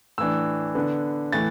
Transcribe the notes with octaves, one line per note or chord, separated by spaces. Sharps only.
A2 E3 D4 E6
D3 B3 D4
A2 E3 A3 A6